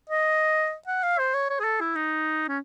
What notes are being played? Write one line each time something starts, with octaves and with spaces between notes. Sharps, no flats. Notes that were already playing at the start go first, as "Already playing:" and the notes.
D#5
F#5
F5
C5
C#5
C#5
G#4
A4
E4
D#4
C#4